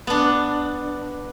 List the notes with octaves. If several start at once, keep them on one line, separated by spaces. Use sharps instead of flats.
B3 D4